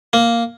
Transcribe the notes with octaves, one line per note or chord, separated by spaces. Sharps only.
A#3